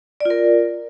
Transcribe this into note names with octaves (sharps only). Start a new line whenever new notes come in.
F4 A#4 D5